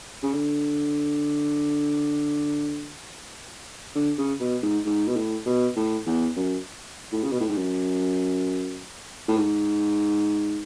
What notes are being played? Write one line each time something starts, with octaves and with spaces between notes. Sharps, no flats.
C#3
D3
D3
C#3
B2
G#2
G#2
B2
A2
B2
A2
E2
F#2
A2
C#3
B2
A2
G#2
F#2
A2
G#2